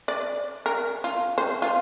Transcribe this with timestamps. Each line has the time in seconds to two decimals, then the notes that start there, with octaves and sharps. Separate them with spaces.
0.08 D5
0.66 A#4
1.04 F4
1.38 C5
1.62 F4